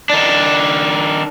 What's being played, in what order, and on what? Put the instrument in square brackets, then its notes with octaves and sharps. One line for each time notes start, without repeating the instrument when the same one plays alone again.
[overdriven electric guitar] D#3 D4